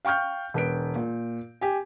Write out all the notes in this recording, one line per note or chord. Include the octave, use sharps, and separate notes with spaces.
F5 G5 C#6 F6 G6
E1 B4 D7
A#2
G4 G#5